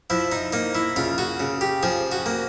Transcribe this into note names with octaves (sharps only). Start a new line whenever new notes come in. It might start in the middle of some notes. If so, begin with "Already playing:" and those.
F3 E4
D#4
A#3 D#4
E4
C#3 F4
F#4
C#3
G4
F3 G#4
F#4
A#3